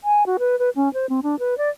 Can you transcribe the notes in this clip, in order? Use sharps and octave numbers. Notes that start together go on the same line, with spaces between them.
G#5
F#4
B4
B4
C#4
C5
C4
D4
B4
D5